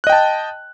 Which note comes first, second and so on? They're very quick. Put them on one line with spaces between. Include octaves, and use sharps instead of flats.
F#6 D#5 G5 A5